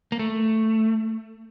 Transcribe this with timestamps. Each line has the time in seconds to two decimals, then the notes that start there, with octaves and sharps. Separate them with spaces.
0.12 A#3
0.19 A3